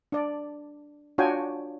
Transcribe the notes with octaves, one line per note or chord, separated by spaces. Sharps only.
D4 D5
D4 F4 F#4 C#5 G5 G#5